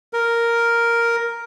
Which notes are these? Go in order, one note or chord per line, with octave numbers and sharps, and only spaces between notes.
A#4